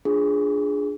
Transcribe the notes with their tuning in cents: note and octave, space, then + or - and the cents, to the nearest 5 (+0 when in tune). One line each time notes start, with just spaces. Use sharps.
D4 +0 F4 +0 G#4 +0